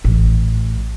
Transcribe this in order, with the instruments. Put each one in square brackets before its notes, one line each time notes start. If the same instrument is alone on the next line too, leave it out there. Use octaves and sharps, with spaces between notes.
[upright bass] A1